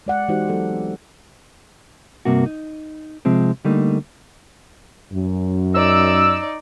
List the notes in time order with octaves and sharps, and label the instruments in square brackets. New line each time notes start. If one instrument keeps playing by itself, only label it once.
[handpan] G#3 D5 F#5
E3 G#3 D#4 F#4 G4 C5
F#3 B3 A4
C4
[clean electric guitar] G2 C3 A#3 F#4
D#4
C3 F3 G#3 C4
D3 G3 A3 A#3 D#4
[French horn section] F#2
[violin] D#4 D5 [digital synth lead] E6